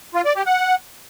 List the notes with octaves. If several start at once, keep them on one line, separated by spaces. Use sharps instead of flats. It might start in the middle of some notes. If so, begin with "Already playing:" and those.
F4
D5
G4
F#5